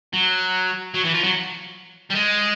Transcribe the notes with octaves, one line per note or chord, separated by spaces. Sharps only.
F#3
F#3
E3
F3
F#3
G3
G#3